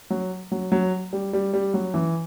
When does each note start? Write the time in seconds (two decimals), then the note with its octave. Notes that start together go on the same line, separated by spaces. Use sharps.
0.10 F#3
0.52 F#3
0.72 F#3
1.13 G3
1.33 G3
1.54 G3
1.74 F#3
1.94 E3